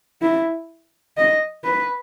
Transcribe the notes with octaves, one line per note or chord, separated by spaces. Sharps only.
E4
D#5
B4